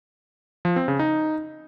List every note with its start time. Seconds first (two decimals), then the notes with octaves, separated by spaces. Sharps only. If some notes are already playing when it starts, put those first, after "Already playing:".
0.65 F3
0.76 C4
0.88 C#3
0.99 D#4